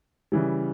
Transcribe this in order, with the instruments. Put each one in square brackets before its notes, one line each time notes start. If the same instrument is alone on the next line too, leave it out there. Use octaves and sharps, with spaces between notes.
[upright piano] C#3 E3 G3